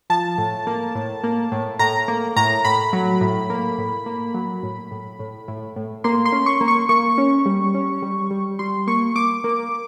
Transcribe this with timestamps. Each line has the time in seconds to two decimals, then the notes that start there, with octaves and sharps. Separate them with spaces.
0.10 F3 A5
0.38 A2
0.67 A#3
0.95 A2
1.23 A#3
1.52 A2
1.79 A2 A#5
2.08 A#3
2.36 A2 A#5
2.65 A2 B5
2.93 F#3
3.21 A2
3.50 A#3
3.78 A2
4.06 A#3
4.34 F#3
4.63 A2
4.91 A2
5.19 A2
5.48 A2
5.76 A2
6.04 A#3 C6
6.26 C6
6.32 C#4
6.46 C#6
6.61 A#3
6.68 C#6
6.89 A#3 C#6
7.18 C#4
7.46 G3
7.74 C#4
8.02 G3
8.31 G3
8.59 G3 C6
8.87 A#3 C#6
9.16 A#3 D6
9.44 A#3